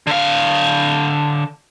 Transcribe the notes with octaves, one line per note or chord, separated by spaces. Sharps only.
D3 F5